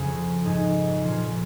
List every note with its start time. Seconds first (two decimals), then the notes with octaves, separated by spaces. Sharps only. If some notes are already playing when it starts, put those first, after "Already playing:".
Already playing: F2 C#3 F3 C#4 G#4
0.44 G#2 G#3 D#4 G#4
1.02 A#2 F3 C#4 F4